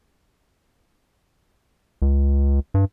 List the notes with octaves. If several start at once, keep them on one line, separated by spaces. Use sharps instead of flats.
C#2
G2